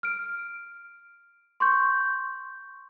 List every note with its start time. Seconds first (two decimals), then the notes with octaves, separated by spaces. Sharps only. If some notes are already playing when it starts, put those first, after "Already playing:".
0.03 F6 D7
1.60 C6 C#6 G6